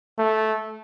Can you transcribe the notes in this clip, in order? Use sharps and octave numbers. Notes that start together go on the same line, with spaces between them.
A3